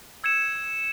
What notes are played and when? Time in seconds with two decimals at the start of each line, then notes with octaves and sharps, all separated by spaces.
0.24 E6 G#6 C#7 E7